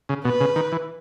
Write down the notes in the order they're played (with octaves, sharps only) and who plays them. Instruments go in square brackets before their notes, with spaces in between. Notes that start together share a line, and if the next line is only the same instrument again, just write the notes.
[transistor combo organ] C#3
[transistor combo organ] B2 [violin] B4
[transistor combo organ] C#3
D#3
E3